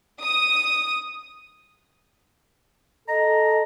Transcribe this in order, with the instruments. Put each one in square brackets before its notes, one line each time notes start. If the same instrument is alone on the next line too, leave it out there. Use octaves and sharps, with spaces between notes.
[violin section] D#6
[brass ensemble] A4 [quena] D#5 [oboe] A#5